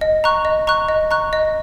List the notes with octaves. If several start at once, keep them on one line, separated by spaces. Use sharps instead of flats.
D#5
A#5 C#6 F#6
D#5
A#5 C#6 F#6
D#5
A#5 C#6 F#6
D#5